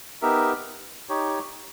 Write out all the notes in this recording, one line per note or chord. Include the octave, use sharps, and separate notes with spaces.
B3 D#4 G4 A#4 E5
D#4 G4 C#5